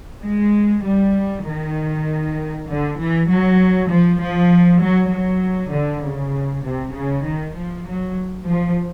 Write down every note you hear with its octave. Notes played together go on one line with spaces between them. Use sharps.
G#3
G3
D#3
D3
E3
F#3
F3
F3
F#3
F#3
D3
C#3
C3
C#3
D#3
F3
F#3
F3